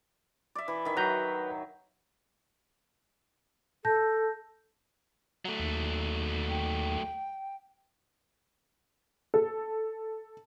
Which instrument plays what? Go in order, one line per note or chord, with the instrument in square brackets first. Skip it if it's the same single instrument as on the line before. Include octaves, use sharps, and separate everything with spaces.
[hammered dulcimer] D5 E5
E3
D#3 E5
[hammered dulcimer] F#3 [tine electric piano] B4 A#5 G6
[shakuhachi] A4 [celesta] A5 G6 A#6
[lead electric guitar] F#3 A3
[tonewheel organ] D#2
[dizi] G5
[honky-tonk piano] A4